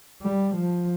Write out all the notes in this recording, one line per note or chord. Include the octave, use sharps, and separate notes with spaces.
G3
F3